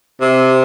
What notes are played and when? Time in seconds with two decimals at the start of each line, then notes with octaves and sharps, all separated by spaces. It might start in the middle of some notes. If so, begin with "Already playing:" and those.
0.21 C3